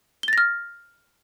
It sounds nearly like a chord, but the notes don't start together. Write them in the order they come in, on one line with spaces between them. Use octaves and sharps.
G7 A6 A#6 F6